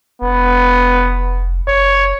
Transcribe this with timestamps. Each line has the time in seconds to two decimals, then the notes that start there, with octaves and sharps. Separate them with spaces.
0.22 F1 B3
1.68 F#1 C#5